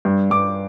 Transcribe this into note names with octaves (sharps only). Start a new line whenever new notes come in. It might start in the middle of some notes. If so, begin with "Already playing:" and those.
G2
G2 D6